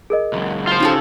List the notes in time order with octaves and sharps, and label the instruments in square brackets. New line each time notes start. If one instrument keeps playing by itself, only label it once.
[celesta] G#4 A#4 D#5
[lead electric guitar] C#2 F#2
[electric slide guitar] F4 C5
[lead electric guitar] C#3 [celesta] D#4 [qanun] F#4 G4 A4